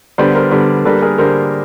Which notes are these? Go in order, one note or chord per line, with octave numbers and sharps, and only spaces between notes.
D3 G3 B3 C5 D5
A#4 C5
D3 G3 B3
D3 G3 A#3 A4 B4
G#4 A#4
D3 G3 A#3 A#4 C5